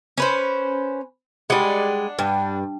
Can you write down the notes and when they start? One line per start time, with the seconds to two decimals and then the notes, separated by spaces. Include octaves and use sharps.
0.18 C#4 B4 C5
1.50 G3 G#3 D4 F#5
2.19 G2